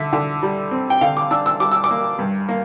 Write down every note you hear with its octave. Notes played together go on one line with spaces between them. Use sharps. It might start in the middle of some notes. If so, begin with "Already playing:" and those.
Already playing: D3 E5
D3
G3
C4
G5
D3 F5
D6
D4 E6
E6
G3 D6
E6
D6
A#3
G2
A#3